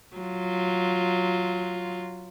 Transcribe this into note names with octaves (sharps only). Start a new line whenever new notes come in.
F#3 F4